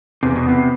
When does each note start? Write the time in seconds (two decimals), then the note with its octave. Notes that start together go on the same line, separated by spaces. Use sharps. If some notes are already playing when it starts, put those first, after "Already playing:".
0.23 E2 C3
0.36 B2
0.46 C3 B3